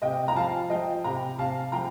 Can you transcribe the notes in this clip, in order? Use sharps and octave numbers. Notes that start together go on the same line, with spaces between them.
C3 D#5 G5
A#5
F3 F5 A5
F3 D#5 G5
C3 G5 A#5
C3 F5 A5
F3 G5 A#5